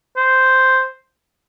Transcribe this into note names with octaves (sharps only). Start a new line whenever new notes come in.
C5